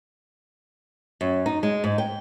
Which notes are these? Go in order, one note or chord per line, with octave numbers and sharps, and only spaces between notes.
F#2
D#4
G#3
G#2
G5